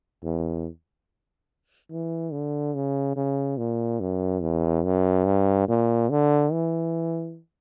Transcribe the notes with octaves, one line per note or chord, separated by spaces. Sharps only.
E2
E3
D3
C#3
C#3
A#2
F#2
E2
F#2
G2
A#2
D3
E3